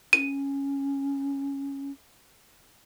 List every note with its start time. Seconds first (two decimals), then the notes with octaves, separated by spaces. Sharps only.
0.13 C#4 D#7